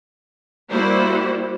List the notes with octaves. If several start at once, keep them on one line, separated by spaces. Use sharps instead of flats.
G3 A#3 E4 F#4 C5 D5